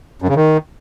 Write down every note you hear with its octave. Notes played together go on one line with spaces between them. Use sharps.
F#2
C#3
D#3